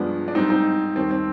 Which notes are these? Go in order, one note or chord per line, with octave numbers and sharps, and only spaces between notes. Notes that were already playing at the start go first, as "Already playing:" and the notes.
Already playing: G2 F3 G#3 B3 D4
D4
G#2 G3 C4 D#4
C4 D#4
D#2 D#3 G3 C4
C4